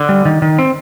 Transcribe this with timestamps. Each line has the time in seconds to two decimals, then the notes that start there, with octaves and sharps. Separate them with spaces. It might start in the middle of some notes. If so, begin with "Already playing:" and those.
Already playing: D3
0.09 G3
0.25 D#3
0.42 D#3
0.59 C4